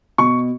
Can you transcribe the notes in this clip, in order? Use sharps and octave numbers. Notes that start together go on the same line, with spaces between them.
B2 C#6